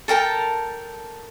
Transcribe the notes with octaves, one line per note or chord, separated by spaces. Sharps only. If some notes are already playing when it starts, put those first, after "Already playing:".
A4 A#4 G5 A5